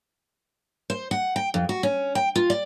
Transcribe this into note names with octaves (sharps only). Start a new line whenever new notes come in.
C5
F#5
G5
F2
F#4
C#4
G5
F4
D5